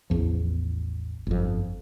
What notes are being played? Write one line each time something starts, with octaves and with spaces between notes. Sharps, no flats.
A1 E2 F3
G1 F2